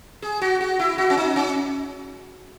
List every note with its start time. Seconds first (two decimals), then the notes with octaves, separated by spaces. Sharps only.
0.22 G#4
0.42 F#4
0.61 F#4
0.79 E4
0.98 F#4
1.10 C#4
1.17 D#4
1.36 C#4